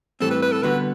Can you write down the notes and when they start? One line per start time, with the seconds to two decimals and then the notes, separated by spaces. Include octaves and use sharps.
0.20 A2 E3 G3 C4 A4
0.31 B4
0.42 B4
0.52 A4
0.63 D3 G3 B3 F#4 B4